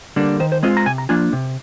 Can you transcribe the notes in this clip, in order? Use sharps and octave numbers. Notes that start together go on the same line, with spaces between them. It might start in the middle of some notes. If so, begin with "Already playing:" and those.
D3 G3 A#3 D4
D#3 C5
C5
G#3 C4 F4 D#5
A#5
C3 G#5
A#5
F3 A#3 D4 F4 G#5
C3